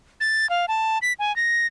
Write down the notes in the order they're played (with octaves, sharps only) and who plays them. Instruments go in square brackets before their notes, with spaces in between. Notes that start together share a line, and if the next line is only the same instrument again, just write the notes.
[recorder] A6
F5
A5
B6
G#5
A#6